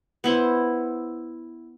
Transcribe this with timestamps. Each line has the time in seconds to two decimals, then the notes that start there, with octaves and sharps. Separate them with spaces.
0.24 B3 E4 C5